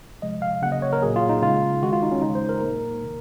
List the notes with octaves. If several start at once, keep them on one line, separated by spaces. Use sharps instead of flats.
C3 F3 G#3 D#5
F5
C#3 F#3 A#3 F#5
D#5
C#5
A#4
A#2 F#3 A#3 G#4
F4
D#4
C#3 G#3 F4
D#3 G#3 F#4
F4
D#4
C#4
C#3 G#3 D#4
C5
A#4
A#2 F#3 A#3
C3 D#3